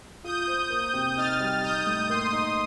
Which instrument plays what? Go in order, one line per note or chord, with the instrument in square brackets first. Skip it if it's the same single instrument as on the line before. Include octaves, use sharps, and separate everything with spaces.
[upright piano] F4 [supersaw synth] D#6 G6
[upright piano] C5
A#3
C3
[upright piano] D#4 [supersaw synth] F6 A6
[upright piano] G3
[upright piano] D#4 [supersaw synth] D#6 G6
[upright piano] A2
[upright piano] A#3 [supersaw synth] C6 D#6
[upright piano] D#4